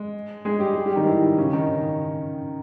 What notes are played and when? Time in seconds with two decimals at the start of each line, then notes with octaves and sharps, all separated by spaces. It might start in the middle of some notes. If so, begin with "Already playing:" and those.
Already playing: G#3
0.45 G#3 G#4
0.60 G3 G4
0.75 G3 G4
0.86 G3 G4
0.96 D#3 D#4
1.07 E3 E4
1.37 C#3 C#4
1.53 D#3 D#4